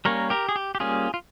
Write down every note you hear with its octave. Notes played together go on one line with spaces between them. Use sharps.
G3 A#3 C#4 A#4 C#5
G4 A#4
G#4
G4
G4
G3 A#3 C#4 F4 G#4
F4